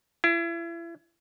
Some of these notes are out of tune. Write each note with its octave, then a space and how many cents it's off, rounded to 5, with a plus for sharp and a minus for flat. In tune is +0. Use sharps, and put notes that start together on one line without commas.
E4 +35